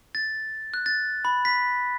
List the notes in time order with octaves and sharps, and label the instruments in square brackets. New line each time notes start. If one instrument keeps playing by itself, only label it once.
[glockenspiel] A6
F#6
A6
B5
B6